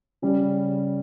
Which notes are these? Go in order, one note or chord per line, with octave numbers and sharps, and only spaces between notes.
C#3 G3 C#4